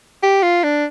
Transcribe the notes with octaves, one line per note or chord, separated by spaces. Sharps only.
G4
F4
D4